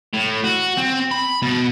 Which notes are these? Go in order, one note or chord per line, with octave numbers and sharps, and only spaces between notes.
A2
F#4
C4
B5
B2